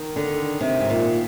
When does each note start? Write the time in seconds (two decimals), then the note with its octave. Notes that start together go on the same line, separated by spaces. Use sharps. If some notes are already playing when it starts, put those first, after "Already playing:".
Already playing: D#3
0.16 D3
0.60 C3
0.80 G#2
0.90 A#2